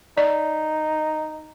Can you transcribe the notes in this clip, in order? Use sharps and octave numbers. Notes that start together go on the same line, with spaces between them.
D#4 D5